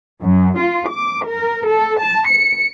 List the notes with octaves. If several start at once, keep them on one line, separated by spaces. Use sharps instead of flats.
F#2
F4
D6
A#4
A4
A5
C#7